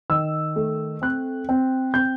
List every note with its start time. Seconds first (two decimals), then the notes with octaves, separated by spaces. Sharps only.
0.10 D#3 E6
0.56 A3
1.02 C4 F#6
1.49 C4
1.94 C4 G6